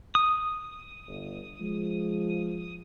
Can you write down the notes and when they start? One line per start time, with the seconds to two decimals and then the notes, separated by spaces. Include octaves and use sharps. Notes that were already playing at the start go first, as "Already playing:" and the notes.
0.15 D#6
1.07 G1
1.61 F3 G#3